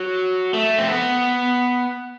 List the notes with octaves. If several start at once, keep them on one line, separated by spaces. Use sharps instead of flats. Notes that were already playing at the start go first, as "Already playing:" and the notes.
Already playing: F#3
A3
C4
B3